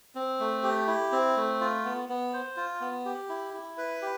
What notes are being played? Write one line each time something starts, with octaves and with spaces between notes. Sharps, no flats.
C4
A3
G4
E4
C4
A3
F4
B3
B3
C5
F4
B3
G4
E4
E4
B4
G4